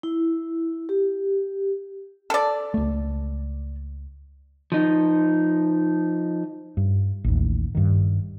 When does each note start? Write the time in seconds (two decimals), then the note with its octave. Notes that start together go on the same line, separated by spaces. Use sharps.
0.03 E4
0.89 G4
2.30 A4 D5
2.74 C#2 A3
4.72 F3 D#4
6.77 G2
7.24 A1 D#2
7.75 G2 D#3